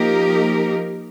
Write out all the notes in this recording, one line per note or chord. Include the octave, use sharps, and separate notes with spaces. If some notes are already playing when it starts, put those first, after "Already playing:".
Already playing: F3 A#3 D#4 G4 A#4